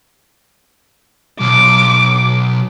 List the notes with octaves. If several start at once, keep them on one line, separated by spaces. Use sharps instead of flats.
B1 D6